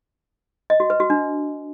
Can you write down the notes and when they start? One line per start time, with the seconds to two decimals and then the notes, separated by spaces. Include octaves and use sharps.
0.70 D#5
0.80 F#4
0.90 B4
1.00 F#4
1.10 D4